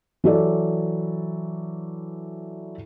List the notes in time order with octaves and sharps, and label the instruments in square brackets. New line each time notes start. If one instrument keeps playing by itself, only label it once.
[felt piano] E3 F#3 A4 D5